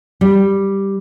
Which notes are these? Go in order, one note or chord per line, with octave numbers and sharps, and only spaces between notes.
G3